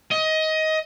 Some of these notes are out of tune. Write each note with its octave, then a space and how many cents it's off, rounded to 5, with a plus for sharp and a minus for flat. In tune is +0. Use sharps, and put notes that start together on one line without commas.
D#5 +20